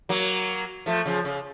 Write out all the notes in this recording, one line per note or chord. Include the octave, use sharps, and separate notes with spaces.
F#3 A#3
F3 A3
C#3 F3
C#3